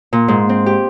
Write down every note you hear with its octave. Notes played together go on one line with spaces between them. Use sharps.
A#2
G#2
C4
G4